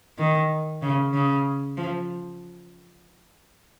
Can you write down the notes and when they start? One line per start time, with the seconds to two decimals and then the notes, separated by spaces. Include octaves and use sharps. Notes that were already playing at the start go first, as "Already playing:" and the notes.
0.18 D#3
0.82 C#3
1.13 C#3
1.77 F3